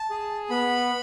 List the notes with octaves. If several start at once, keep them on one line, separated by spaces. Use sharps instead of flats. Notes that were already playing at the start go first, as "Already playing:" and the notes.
Already playing: A5
G#4
B3 B5